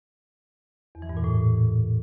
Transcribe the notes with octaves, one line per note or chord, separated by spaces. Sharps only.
E2
E3
G2
A#2
A2